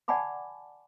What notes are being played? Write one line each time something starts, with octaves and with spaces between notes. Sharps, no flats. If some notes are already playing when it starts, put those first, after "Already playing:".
D5 F#5 G#5 A5 B5 D6